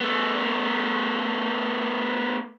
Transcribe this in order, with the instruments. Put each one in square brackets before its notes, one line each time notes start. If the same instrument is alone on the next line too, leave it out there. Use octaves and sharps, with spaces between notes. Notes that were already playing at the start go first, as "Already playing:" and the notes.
[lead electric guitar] A3 B3